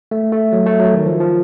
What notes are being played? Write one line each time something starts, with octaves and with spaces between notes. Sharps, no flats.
A3
A3
F#3
A3
F#3
D#3
F3
F3